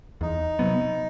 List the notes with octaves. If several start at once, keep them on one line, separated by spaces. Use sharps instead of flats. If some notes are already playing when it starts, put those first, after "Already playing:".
E2 D#4
C3 F#3 B3